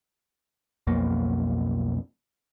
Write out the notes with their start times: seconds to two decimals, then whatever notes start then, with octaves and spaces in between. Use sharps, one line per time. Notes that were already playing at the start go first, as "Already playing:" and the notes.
0.87 B1 F2 B2 A#3